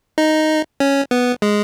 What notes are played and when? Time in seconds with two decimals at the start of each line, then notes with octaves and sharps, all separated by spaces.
0.18 D#4
0.80 C#4
1.11 B3
1.42 G#3